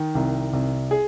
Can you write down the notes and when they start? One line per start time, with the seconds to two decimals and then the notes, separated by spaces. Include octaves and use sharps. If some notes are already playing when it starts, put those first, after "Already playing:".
Already playing: D#3
0.15 C2
0.53 C2
0.91 G#4